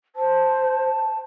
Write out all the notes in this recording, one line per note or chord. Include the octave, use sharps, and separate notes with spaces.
C5 A5